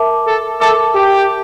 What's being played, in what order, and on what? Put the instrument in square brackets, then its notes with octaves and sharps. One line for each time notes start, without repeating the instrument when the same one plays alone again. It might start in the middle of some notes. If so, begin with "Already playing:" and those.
Already playing: [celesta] A#4 E5 A5 D6
[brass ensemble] A4
[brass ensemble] A4 [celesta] A#4 E5 A5 D6
[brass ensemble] G4